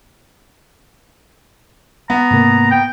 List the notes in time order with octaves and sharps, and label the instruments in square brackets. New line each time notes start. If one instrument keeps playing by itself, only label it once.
[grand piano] B3 [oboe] A#5
[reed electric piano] G#2 C3 A#3
[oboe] G5